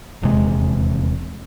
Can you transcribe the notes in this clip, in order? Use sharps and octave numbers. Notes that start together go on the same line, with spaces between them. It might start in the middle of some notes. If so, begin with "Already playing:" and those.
D#1 E2 C3 G#3